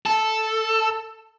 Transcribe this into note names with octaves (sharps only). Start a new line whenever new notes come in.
A4